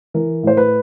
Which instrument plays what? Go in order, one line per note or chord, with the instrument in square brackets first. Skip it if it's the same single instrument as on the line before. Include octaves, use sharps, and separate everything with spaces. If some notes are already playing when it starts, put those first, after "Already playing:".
[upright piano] E3 A#4
A2 C5
B4